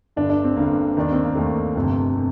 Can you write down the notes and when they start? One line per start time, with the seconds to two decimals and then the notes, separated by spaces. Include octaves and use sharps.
0.16 G1 G2 D3 D4
0.30 D4
0.44 C4
0.56 G1 G2 D3 A#3
0.97 D#2 D#3 D4
1.11 C4
1.25 A#3
1.35 D#2 D#3 A3
1.76 G1 F2 C3
2.16 C3